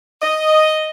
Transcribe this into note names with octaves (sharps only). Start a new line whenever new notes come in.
D#5